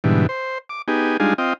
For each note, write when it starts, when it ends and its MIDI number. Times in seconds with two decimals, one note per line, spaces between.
0.04 0.27 44
0.04 0.27 47
0.04 0.27 50
0.04 0.27 52
0.04 0.27 55
0.29 0.58 72
0.69 0.82 86
0.88 1.17 59
0.88 1.17 63
0.88 1.17 67
0.88 1.17 68
1.20 1.34 55
1.20 1.34 56
1.20 1.34 62
1.20 1.34 63
1.20 1.34 65
1.20 1.34 68
1.38 1.53 60
1.38 1.53 65
1.38 1.53 75
1.38 1.53 79